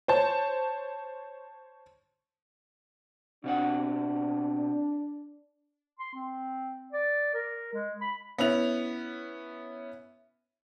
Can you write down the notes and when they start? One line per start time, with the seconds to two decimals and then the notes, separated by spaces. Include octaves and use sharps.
0.08 C5 C#5 A5
3.44 B2 C4 D4 F#5
5.99 C6
6.14 C4
6.93 D5
7.34 A#4
7.73 G#3
8.01 B5
8.38 B3 C#4 E4 F7